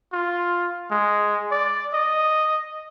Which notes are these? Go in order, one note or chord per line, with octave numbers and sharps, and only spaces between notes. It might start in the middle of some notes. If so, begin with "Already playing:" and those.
F4
G#3
D5
D#5